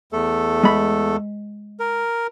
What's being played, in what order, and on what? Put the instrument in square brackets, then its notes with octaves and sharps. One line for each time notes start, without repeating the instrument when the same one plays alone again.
[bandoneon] E2 A3 A4
[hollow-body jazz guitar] G#3 B5
[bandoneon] A#4